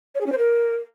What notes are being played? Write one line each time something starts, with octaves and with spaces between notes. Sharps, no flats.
C#5
G#4
C#4
C5
A#4